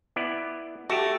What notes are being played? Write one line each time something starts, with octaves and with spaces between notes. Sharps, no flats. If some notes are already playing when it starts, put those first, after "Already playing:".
B3 E4 D5
A3 F#4 G4